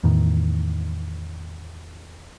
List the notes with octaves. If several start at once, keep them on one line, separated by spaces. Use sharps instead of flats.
E2 A2 D#3